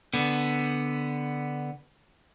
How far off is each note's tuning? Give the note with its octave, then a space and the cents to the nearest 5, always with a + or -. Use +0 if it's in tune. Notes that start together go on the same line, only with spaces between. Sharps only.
D3 +0 B3 +0